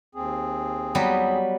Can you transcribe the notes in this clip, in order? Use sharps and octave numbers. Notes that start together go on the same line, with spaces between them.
D#2 C4 G#4
F#3 G3 B3